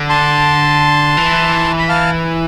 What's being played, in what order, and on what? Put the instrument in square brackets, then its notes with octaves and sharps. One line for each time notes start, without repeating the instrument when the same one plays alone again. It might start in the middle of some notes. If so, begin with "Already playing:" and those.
Already playing: [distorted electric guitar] D3
[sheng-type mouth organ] A5 C6
[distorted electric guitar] E3
[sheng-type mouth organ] B5
F5 A5